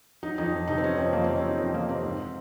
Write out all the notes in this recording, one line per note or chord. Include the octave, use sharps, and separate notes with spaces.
F#3 D#4
F2 D#4
F2
C3 D#4
C4
F#3 C#4
F2 C4
F2 A#3
C4
C3
C#4
F#3 D#4
F2 C#4
F2 A#3
C3 C4
G#2